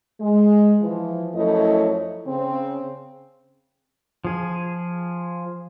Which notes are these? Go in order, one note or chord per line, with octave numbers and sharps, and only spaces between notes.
G#3
E3 F3
F#2 F3 A3 E4 C#5 D#5
C#3 C4
F3 G#4